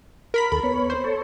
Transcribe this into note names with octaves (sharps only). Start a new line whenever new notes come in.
A#4 B5 B6
D#2 A4 B5
B3 C#5
C5
A4 C#5